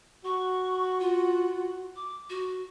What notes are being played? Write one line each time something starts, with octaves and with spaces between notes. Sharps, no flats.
F#4 C#6
F4
D6
F#4